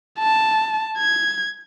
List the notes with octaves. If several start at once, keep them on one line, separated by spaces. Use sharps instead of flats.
A5
G#6